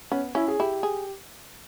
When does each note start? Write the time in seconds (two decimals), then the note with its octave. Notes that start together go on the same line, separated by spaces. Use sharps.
0.12 B3 C#4
0.35 C#4 E4
0.48 G#4
0.60 E4 G4
0.83 G#4